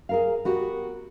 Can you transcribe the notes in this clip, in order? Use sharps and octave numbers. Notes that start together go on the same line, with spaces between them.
G#4 A#4 F5
B3 F#4 G4 A#4